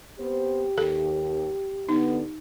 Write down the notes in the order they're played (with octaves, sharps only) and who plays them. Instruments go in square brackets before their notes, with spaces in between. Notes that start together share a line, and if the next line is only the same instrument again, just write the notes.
[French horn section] B3 C4 C5 [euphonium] G4
[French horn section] D#2 [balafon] A4
[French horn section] D3 B3 [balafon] D#4